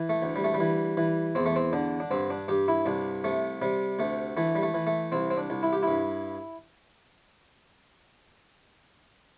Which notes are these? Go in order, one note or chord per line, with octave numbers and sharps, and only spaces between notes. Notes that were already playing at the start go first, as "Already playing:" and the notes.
Already playing: E3
A3
D2
G3
A3
G3
E3
E3
E2 C4
A3
C4
D3 D4
D4
G2 C4
D4
G2 G4
E4
C2 D4
C3 A3
C3 G3
D2 A3
E3 A3
G3
A3
E3
A3
C2 C4
C4
D4
C2
E4
G4
G2 E4